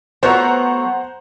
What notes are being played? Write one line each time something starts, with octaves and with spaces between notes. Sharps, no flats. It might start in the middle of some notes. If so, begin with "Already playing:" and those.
F#3 A3 B3 C5 F#5 A#5